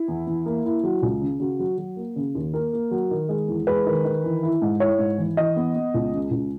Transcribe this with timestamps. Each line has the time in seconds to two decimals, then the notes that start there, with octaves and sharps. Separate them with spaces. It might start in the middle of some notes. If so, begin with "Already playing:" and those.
Already playing: E4
0.08 E2
0.27 E2
0.46 A#3
0.65 E4
0.83 F#3
1.02 C#2
1.22 C#3
1.40 C#3 F#4
1.59 F#3
1.78 F#3
1.96 A#3
2.16 C#3
2.35 D#2
2.54 A#3 A#4
2.73 A#3
2.91 F#3
3.11 D#3
3.29 G#3
3.48 E2
3.67 G#3 B4
3.86 D#3
4.05 D#3
4.24 E3
4.43 E4
4.62 G#2
4.80 E4 C#5
4.99 G#2
5.18 E3
5.37 E3 D#5
5.56 B3
5.75 B3
5.94 C#2
6.13 C#3
6.31 C#2